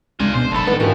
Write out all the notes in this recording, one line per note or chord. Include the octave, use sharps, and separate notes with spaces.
C#2 G#3 D4 D#4 F4 G#5
B2 C5
F#1 E2 A4 A5 B5
A2 D#3 G#3 B3 D4
G#1 D3 E3 F3 C#4 F#4 G4 A#4